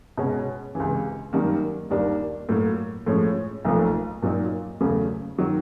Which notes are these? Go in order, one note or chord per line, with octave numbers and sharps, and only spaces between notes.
B2 G#3 C#4
C#2 C3 E3
F#2 D#3 G3 A#3
D#2 D#3 G3 A#3 D4
A2 F#3 A#3
A2 F3 G#3 C#4
B1 A#2 F3 A3
A#2 F#3 A#3 D#4
E2 C#3 F#3 A3
D#3 F#3